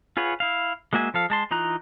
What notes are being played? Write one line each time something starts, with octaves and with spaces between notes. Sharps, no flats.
F4 G#4 B4 C#5 F#5
E4 F5
G#3 A#3 F#4 E5 G#5
F3 A4 F5
G#3 A5 C6
E3 D#4 F4 A#5 F#6